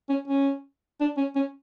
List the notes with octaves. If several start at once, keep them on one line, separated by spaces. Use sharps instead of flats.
C#4
C#4
D4
C#4
C#4